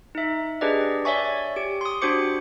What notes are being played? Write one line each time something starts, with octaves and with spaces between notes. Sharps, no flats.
D#4 E5
D4 G4 G#4 B4 D5 D#5
C#5 D5 E5 G#5 C#6
G4 D7
C6 D#6
D4 F#4 G4 C5 D6 C#7